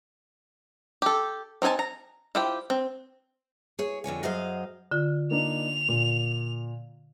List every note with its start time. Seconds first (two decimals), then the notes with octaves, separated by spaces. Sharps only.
1.02 G4 A4
1.62 C4 D#4 G#4 G#5 A5
1.79 A#5
2.35 E4 F4 G4 C5 G5
2.70 C4
3.79 G#4 C#5
4.04 F2 D3 C#5 G#5
4.23 F#2 F#3 G#4 C5 D#5 F5
4.91 D3 F4
5.31 A#3 D4 D#4 F7
5.89 A#2